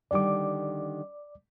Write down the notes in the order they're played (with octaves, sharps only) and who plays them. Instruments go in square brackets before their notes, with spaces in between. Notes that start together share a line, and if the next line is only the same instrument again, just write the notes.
[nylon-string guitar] D3 D#3 G3 [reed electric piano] D5 D6